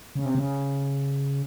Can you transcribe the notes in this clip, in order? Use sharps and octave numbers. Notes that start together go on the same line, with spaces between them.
C#3
C3
C#3